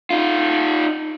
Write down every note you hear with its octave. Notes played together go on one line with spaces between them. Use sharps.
D#4 F4